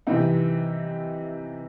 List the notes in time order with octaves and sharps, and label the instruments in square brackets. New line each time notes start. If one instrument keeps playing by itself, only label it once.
[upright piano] C3 E3 C4 D#4